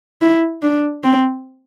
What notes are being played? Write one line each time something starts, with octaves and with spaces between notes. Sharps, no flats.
E4
D4
C4